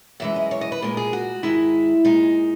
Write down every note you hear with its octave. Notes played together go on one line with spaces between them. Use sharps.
F#2 E3 G#3 E5
D#5
C#5
D#5
B4
A#2 G#3 A#4
G#4
F#4
G#2 D#3 G#3 E4
A#2 G#3 D#4